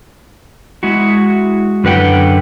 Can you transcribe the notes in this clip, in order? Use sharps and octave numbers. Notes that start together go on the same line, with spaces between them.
G#3 E4 F#4
F#2 D3 B4 F#5 G5